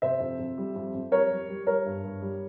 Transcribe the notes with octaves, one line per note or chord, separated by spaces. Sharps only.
C3 C5 E5
F2
F2
G3
F2
F2
G3 A#4 C#5
G3
G3
G3 A#4 C#5
G2
G2
G3